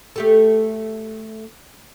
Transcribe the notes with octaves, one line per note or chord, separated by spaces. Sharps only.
A3 G4 A4